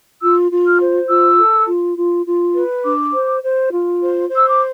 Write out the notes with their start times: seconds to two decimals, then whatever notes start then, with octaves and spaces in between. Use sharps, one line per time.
0.22 F4 E6
0.51 F4
0.65 F6
0.80 C5
1.09 F4 E6
1.38 A4
1.67 F4
1.96 F4
2.26 F4
2.55 B4
2.84 D4 D6
3.12 C5
3.42 C5
3.71 F4
4.01 C5
4.29 C5
4.35 E6
4.48 D6